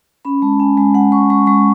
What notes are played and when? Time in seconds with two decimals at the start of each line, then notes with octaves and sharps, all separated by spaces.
0.25 C#4 B5
0.42 G#3 A5
0.60 C#4 G#5
0.77 G#3 G#5
0.94 G#3 F#5
1.12 G#3 C#6
1.30 G#3 C#6
1.47 G#3 C#6